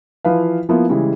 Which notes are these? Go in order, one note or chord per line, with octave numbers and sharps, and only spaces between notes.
E3 F3 B4 F5
F3 A#3 B3 E4 F4
C#3 E3 G3 G#3